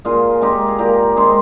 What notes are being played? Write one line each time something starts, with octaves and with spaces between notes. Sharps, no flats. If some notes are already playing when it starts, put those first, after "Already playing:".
A#2 F4 G#4
G#3 D#4 G4 A#4
G#4
A#2 G4 A#4
G#3 D#4 G#4 C5